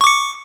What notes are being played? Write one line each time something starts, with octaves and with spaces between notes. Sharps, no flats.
C#6 D6 C#7